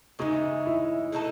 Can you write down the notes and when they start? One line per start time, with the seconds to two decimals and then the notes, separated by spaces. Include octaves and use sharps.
0.19 C#3 E3 G#3 D#4
0.66 E4
1.12 B2 A3 D#4 A4